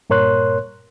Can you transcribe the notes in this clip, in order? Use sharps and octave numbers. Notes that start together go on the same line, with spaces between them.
G2 A#2 A#4 C#5 C6 F#6